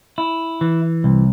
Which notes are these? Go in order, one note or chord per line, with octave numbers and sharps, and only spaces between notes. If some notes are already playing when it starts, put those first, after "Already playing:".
E4
E3
C2